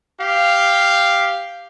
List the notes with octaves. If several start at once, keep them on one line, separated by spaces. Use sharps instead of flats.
G4 F5